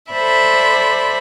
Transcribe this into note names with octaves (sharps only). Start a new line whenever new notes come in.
A4 C5 D5 E5 B5